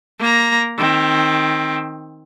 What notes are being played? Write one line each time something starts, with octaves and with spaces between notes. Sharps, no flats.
A#3 A#5
D#3 C4